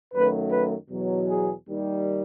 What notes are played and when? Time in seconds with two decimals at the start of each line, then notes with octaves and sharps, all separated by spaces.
0.13 F#2 D#3 F#3 A3 B4
0.51 B4
0.90 E2 B2 F#3
1.28 G#4
1.67 D#2 D#3 G3